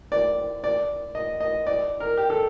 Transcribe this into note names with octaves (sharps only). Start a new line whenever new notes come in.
D5
D5
D#5
D#5
D5
A#4
G4
A4